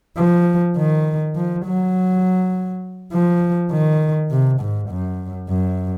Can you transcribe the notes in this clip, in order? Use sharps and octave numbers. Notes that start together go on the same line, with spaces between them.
F3
D#3
F3
F#3
F3
D#3
C3
G#2
F#2
F#2